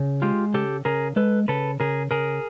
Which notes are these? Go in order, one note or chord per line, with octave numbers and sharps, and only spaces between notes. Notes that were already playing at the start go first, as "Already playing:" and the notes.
Already playing: C#3
G#3 F4 G4
C#3 G4 A4
C#3 G#4 A#4
G#3 A4 B4
C#3 A4 B4
C#3 G#4 A#4
C#3 G#4 A#4